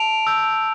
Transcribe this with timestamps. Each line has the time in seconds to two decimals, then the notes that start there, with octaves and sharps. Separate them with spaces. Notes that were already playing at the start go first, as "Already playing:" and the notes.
Already playing: A5 D7 F7
0.27 E6 G6